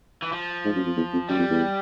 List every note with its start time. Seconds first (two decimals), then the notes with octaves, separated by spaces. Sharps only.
0.22 E3
0.33 F3
0.65 G#2
0.76 F#2
0.86 F2
0.96 E2
1.13 F2
1.29 F#2 G3
1.39 F2
1.50 E2